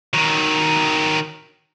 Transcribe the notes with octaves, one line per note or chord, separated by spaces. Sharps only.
D#3 F#3